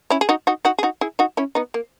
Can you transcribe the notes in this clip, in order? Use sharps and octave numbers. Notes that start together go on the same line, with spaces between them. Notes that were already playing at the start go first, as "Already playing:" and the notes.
C#4 E4
G#4
D#4 F#4
D#4 F#4
D#4 F#4
G#4
D#4 F#4
E4 G#4
D#4 F#4
C#4 E4
B3 D#4
A#3